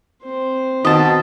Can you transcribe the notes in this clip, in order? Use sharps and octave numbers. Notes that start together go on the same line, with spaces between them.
C4 C5
B2 D#3 D#5 A5